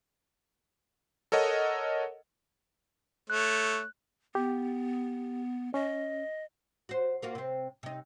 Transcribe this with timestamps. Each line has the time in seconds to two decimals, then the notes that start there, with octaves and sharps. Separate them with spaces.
1.32 A4 A#4 C#5 D#5 F#5
3.30 A3 C#5 F#6
4.35 B3 G4
5.74 C#4 D#5
6.89 F#4 C5
7.22 A#3 F4 F#4
7.35 C3 C4
7.83 C3 D#4